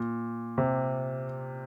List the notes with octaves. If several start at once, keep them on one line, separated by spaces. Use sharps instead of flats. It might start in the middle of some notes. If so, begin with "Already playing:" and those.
Already playing: A#2
C3